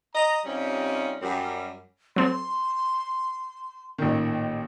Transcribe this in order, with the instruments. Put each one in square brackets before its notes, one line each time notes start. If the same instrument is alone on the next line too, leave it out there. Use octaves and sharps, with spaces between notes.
[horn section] D#5 A#5
C3 G3 C#4 D#4 F4
F#2 G3
[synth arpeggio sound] F#3 C4 A4 [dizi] C6
[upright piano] A1 A#2 D#3